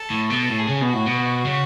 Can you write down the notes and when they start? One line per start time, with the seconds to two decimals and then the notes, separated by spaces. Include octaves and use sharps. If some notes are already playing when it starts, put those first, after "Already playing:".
Already playing: A4
0.10 A2
0.29 B2 A4
0.49 A2
0.58 G#4
0.68 C#3
0.81 B2
0.87 F#4
0.94 A2
1.06 B2
1.45 C#3